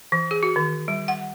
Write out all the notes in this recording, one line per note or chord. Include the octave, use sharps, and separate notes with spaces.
E3
G#4
F#4
D#3
G3
F#5